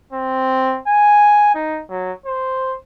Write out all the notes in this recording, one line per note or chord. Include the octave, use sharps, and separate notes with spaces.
C4
G#5
D#4
F#3
C5